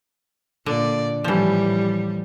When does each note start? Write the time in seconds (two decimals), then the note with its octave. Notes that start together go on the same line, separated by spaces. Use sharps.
0.66 A#2 D3 D5
1.24 A2 E3 F3 G3